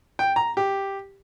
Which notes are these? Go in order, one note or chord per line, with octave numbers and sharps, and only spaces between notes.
G5
A#5
G4